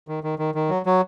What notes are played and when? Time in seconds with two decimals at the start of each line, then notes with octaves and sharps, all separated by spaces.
0.08 D#3
0.24 D#3
0.39 D#3
0.55 D#3
0.70 F#3
0.86 F#3